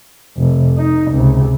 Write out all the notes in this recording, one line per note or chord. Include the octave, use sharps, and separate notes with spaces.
F1
D#4
C#2 C3